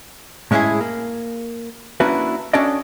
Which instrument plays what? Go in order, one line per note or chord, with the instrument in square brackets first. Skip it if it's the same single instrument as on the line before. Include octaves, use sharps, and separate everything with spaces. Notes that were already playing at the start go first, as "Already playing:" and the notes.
[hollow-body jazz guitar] A2 G#3 C#4 D#4 E4 G#4
A#3
A#3 C#4 D4 E4 F#4 B4
C#4 D4 F#4 A4 D5 D#5